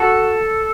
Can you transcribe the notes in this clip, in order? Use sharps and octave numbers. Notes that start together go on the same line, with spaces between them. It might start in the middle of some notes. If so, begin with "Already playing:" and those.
Already playing: F#4 A4